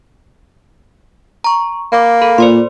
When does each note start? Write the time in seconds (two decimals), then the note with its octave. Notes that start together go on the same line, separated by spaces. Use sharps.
1.44 A#5 C#6
1.92 A#3 B5 D6
2.21 A4 B5
2.38 A#2 C5 D5 C6